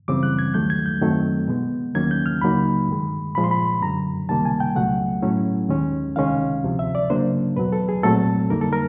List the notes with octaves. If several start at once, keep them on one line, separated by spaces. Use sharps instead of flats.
F#2 C#3 E3 G3 C4 D6
F#6
G#6
D#2 D#3 F#3 A3 G6
G#6
G6
F#2 D#3 F#3 A3 C4
B2 G#3 B3
D#2 D#3 F#3 A#3 C#4 G#6
G6
F6
C#2 C#3 F#3 A#3 D#4 B5
G2 D#3 G#3
A#2 F3 G#3 B5
C6
B5
F#2 D3 F#3 A#5
C#2 C3 D#3 G3 A#3 A5
G#5
G5
C#2 B2 F#3 A3 F#5
A2 F#3 A3 C#4 E4
D#2 D#3 G#3 C#4
C#2 C3 D#3 G#3 C#4 F5
D2 C3 F3
E5
D5
C#3 F#3 A#3 D4 C5
E2 B2 F#3 B4
A4
G#4
C2 A#2 F#3 A3 C4 A4
F2 D3 G3 A#3 D#4 A#4
A4
A#4